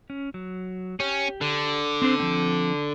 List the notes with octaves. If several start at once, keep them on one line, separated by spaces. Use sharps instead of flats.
C#4
F#3
C#4 G4
D3
C4 D4 C5
F3 C4